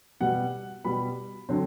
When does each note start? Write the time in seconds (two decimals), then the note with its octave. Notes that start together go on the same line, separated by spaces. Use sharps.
0.20 B2 G3 B3 F#5
0.85 B2 G3 B3 B5
1.49 D3 F#3 C4